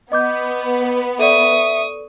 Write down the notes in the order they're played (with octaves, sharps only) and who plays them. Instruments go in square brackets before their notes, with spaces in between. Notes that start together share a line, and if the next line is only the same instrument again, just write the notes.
[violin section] B3 [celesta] D#5 D6 G6
[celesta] A4 D5 [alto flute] E5 [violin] C#6 D#6